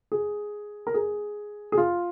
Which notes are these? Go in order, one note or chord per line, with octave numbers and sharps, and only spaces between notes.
G#4
A#4
G#4
G#4
F4